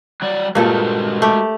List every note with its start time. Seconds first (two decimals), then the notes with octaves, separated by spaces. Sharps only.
0.22 F#3 G3 D5
0.55 G2 A#2 G#3 F#4 A4 C5
1.22 A3 G4